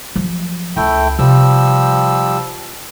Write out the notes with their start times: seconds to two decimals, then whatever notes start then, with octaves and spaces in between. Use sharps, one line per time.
0.16 F3 F#3
0.77 C#2 A3 E4 G5
1.19 C3 F3 G3 E6